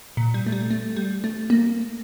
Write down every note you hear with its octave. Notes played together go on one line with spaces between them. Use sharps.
A#2
G3
A3
G3
A3
G3
A3
A#3